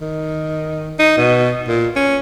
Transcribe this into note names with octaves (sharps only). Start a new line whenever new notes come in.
D#3
D#4
B2
A#2
C#4